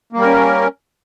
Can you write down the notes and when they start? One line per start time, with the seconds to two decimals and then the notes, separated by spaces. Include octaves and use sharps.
0.13 A#3
0.17 G3
0.21 A#4
0.25 C#4